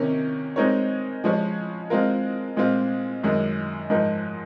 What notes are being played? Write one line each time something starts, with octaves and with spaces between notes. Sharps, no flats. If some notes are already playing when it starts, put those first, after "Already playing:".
Already playing: C3 D#3 A#3 C#4
G#3 C4 D#4 A#4 C#5
C#3 F3 G#3 C#4
G#3 C4 F4 A#4
A#2 G#3 C4 F4
F#2 D#3 G#3
G#2 F3 G#3 D#4 A#4